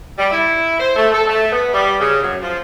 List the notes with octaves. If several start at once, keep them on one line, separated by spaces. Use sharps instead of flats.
G3
E4
C5
A3
A4
A3
B3
G3
C#3
F#2
F3